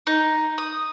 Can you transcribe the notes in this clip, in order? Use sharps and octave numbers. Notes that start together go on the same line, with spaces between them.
D#4
D#6